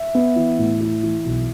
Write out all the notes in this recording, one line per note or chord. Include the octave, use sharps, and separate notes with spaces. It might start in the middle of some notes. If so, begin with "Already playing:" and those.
Already playing: E5
B3
E3
A2
E4
E3
B1